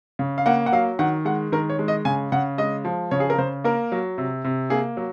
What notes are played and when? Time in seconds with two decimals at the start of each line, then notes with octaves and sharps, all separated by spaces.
0.19 C#3
0.38 F5
0.46 A#3 F#5
0.66 F#5
0.72 F#3 F5
0.99 D#3 F#5
1.25 G#3 F#5
1.52 D#3 A#4
1.70 C#5
1.79 G#3
1.88 D#5
2.05 C#3 G#5
2.32 C#3 F#5
2.58 G#3 D#5
2.85 F3
3.11 C#3 C#5
3.20 G#4
3.30 A#4
3.38 C#3 C5
3.64 A#3 A#4
3.92 F#3
4.18 C3
4.44 C3
4.70 A#3 G#4
4.97 F#3